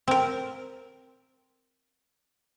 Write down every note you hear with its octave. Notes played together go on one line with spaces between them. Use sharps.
C4 A#4